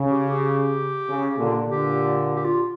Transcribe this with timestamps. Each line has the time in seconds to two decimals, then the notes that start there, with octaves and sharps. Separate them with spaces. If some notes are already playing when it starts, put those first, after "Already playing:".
Already playing: C#3
0.11 G4
0.30 G4
1.08 C#3
1.38 A#2 D3
1.67 A#2 D3 G4
2.36 G4
2.45 F4